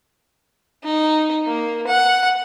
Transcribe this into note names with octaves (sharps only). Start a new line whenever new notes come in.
D#4
A#3
F#5